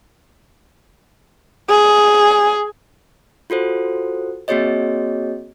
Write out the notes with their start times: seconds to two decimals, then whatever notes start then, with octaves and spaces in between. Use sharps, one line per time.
1.69 G#4
3.50 F4 F#4 A4 C5
4.48 A#3 C4 F#4 G#4 C#5 D#5